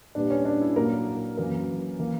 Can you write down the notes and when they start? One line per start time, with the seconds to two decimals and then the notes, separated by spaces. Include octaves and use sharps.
0.15 A#2 G3 B3 D4
0.30 C#4
0.45 D4
0.61 E4
0.76 A#2 F#3 A#3 A#4
1.37 F#2 E3 A#3 A#4
1.99 E3 A#3